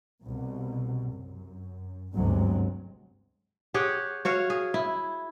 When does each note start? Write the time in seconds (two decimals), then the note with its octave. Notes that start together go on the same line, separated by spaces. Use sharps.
0.24 C2 B2
1.12 F#2
2.14 G1 D2 G#2 C3 F#3 G#3
3.74 G4 G#4 C#5 F#5
4.25 F#4 C#5 F5
4.50 G#4
4.74 E4